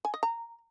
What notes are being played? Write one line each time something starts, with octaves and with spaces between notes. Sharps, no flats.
G#5
D#5
A#5